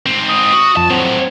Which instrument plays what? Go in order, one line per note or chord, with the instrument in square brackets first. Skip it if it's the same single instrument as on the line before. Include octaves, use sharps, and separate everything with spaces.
[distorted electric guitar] G#2 C4
[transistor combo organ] D#6
[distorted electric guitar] F#4
[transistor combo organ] F2 [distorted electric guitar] A5
[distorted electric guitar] A2 F#3 [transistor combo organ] C4